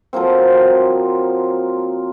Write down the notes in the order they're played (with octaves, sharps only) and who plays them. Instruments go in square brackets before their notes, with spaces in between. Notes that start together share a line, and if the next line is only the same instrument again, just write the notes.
[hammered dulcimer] F3 F#3 A#3 C4